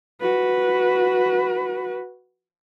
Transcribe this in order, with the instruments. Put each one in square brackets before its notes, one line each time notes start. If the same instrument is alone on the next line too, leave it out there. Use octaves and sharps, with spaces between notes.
[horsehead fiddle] F#4 B4